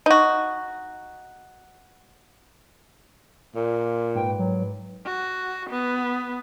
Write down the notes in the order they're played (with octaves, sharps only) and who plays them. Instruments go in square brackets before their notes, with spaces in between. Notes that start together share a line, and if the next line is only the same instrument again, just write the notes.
[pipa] D#4 F#4
[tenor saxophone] A#2
[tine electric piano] G#2 B4 [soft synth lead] G5
[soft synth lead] F#3
[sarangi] F#4
B3